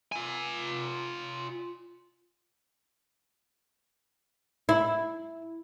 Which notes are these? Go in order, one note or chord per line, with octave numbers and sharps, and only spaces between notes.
F4 G#5
E4